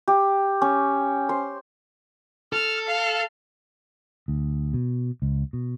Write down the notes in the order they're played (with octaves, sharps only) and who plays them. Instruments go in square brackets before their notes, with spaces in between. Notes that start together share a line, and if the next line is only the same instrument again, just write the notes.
[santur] G4
C#4
C5
[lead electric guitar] A4 [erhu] F6
[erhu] F5
[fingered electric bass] D2
B2
C#2
B2